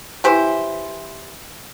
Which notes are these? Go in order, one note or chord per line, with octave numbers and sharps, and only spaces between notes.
E3 G4 C5